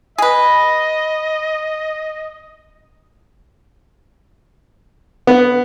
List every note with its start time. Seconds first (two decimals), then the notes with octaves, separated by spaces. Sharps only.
0.18 G#4 B4 D#5
5.27 B3